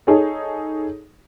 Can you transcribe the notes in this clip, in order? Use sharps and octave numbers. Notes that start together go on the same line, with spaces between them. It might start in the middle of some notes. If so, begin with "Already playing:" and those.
D#4 G#4 A4 C#5